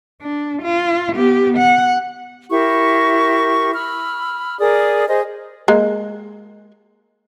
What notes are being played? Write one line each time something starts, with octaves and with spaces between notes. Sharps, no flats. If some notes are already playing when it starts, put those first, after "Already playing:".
D4
F4
B3 G4
F#5
E4 G4 A#4 C#6
B5 E6 F6
G#4 A#4 D5 D#6
G#4 C5 D#5
G#3 A#3